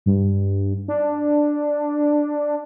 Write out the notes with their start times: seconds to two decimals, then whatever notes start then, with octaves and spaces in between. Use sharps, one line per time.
0.06 G2
0.88 D4